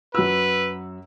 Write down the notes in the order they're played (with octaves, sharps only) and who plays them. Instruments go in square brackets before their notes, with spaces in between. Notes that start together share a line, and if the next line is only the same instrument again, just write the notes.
[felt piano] F#2 F#4 E6 [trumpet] B4